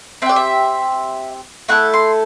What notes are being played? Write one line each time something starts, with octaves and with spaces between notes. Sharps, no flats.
C4 G4 D5 E5
E5
A3 E4 A4 F#5
C6